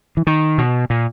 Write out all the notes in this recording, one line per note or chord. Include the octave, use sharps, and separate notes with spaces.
E3
D#3
B2
A#2